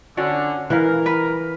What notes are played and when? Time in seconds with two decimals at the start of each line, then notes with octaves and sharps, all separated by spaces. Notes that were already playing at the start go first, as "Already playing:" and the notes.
0.17 D3 C#4 D4 F#4
0.70 E3 E4 A#4 B4 F5
1.06 B4